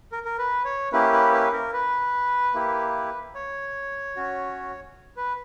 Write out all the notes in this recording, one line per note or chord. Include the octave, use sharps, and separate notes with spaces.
A#4
A#4
B4
C#5
A#3 C#4 E4 G4 B4
B4
B4
A#4
B4
A#3 E4 G4
C#5
C#4 F#4
B4